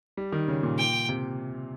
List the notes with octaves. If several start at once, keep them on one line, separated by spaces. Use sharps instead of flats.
G3
D#3
C#3
A#2
G5
C3